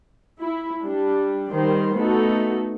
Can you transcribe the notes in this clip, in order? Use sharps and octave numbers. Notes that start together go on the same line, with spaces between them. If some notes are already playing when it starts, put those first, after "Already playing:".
E4
G3 D4
D#3 G3 C5
A3 B3 D#4 F#4 A4